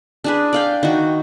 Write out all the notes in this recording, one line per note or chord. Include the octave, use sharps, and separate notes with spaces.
D4 G#4 B4
D5 F5 G5
D#3 F#4